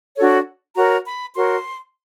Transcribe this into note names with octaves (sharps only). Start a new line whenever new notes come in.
D4 F#4 A4 C#5
F#4 A#4 C#5 A#5
B5
F#4 A#4 C#5 C6